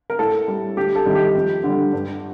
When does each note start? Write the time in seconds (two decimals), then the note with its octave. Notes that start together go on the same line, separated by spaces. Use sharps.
0.10 A#4
0.19 A2 A4
0.48 G3
0.77 D2 G4
0.96 A4
1.06 C3 D#3 G3
1.12 A4
1.15 G4
1.35 F2
1.64 D3 G3
1.93 G2